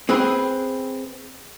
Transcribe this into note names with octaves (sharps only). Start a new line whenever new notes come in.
C4 G#4 B4 G5